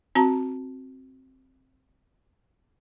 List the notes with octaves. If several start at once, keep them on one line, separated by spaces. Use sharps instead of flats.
C4 F#4 A5 A#5